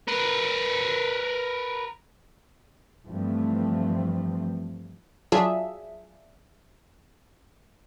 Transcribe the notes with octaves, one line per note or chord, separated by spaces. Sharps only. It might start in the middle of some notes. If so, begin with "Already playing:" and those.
A#4 B4
G2 E3 F3 A3 C4
F#3 D4 F4 G#4 E5